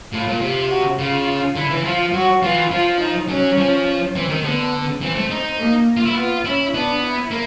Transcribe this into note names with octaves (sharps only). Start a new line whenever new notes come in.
A2 F4
A#2
C3
F#4
C#3 F4
D3 E4
E3
F3 F4
F#3 F#4
E3 F4
F3 F4
D#4
F#3 C#4
F3
E3 C4
D#3
D3 B3
E3 C4
A3
D#4
A#3
F4
E4
B3 F4
C#4 E4
B3 D4
E4
A#3